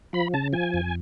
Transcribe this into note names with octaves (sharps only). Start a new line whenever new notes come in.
F3 B5
C#3 A5
F3 G#5
F2